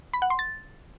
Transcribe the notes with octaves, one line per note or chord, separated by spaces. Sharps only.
B5
F#5
C6
A6